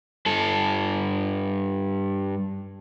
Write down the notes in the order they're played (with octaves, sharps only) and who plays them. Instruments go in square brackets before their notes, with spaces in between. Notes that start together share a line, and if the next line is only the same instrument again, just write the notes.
[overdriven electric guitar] G2 A4